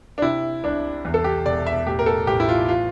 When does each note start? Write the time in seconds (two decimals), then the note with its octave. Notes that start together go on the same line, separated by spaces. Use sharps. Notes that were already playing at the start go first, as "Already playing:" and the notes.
0.18 D4
0.22 C3 E4
0.63 C2 D4
1.05 E2
1.14 A4
1.24 G4
1.46 E1 D5
1.67 E5
1.87 A2 G4
1.99 A#4
2.06 A4
2.27 A1 G4
2.40 E4
2.48 F4
2.68 F4